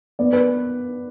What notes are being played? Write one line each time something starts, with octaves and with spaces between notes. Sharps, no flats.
B3 D5
B4